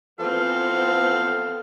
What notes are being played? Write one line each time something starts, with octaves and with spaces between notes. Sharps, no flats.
E3 F3 B3 C4 A4 F5